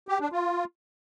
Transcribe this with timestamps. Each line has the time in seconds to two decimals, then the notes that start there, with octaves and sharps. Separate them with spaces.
0.08 G4
0.20 D4
0.32 F4